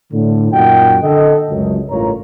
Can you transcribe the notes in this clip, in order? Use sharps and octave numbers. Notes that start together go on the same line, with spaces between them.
A2 D3
F#2 A#2 D#4 F#4 F#5 G5
D3 A4 D#5
C#2 F#2
A1 G2 F4 A#4 C#5 A#5